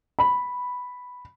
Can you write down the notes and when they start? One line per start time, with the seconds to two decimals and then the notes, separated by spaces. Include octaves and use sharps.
0.19 B5